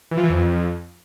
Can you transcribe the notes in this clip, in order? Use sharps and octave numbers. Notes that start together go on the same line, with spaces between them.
E3
F3
E3
F2